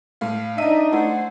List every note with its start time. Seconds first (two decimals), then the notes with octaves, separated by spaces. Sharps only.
0.21 A2 F5
0.58 D4 D#4 D#5 E5 D#7
0.93 A3 E4 C5 F#5